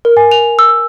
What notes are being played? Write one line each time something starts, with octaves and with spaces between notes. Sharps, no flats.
A#4
G#5
F7
E6